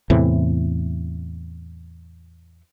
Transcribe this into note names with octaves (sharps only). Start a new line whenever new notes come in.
E2 A2 C3 E3